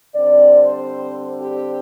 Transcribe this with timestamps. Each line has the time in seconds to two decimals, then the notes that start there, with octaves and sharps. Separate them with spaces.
0.14 D3 G3 C4 D5
0.61 C5
1.40 G4